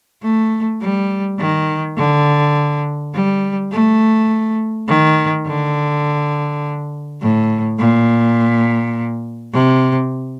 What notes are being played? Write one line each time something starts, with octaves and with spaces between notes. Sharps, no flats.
A3
G3
D#3
D3
G3
A3
D#3
D3
A2
A#2
C3